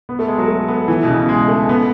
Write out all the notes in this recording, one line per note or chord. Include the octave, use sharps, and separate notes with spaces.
B3
A3
G#3
F#3
A3
B3
E3
B2
C#3
G#3
A3
B3